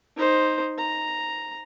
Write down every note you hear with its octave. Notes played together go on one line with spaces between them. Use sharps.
D#4 C5
A#5